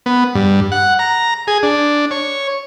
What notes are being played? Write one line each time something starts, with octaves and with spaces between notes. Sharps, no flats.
B3
G2
F#5
A#5
G#4
D4
C#5